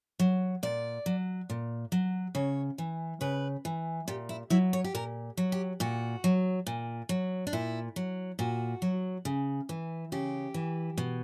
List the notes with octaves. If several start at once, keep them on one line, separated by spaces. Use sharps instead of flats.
F#3
A#2 D5
F#3
A#2
F#3
C#3 C#5
E3
C#3 B4
E3
A#2 G4
E4
F#3 E4
C#5
G4
A#2 A#4
F#3
G4
A#2 F#4
F#3
A#2
F#3
D4
A#2 E4
F#3
A#2 F#4
F#3
C#3
E3
C#3 G4
E3
B2